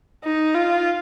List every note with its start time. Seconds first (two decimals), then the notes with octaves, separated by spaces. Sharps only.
0.24 D#4
0.55 F4